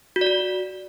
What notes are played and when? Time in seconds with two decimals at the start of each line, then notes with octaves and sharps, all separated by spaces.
0.16 F#4
0.21 D5
0.27 F#4